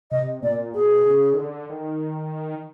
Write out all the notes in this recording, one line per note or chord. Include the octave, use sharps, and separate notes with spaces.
C3 D#5
A#2 D5
B2 G#4
C#3
D#3
D3
D#3